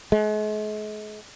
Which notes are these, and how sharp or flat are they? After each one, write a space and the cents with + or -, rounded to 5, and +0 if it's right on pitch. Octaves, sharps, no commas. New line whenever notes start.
G#3 +40